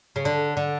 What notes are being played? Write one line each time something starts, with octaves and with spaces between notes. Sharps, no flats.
C#3
D3
D3